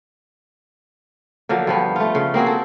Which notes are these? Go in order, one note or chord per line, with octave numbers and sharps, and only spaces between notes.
D3 F3 F#3 A#3
G2 F3 B3
A3 F4
C#3
A#3 C4 F#4 G#4
A4